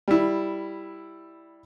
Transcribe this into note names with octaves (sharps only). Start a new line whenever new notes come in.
G3 E4